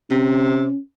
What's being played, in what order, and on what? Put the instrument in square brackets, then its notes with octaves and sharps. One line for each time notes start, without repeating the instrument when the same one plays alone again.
[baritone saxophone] C3 [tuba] C#4